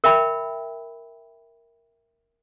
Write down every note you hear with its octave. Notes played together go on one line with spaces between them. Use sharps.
A#4 E5 G5 B5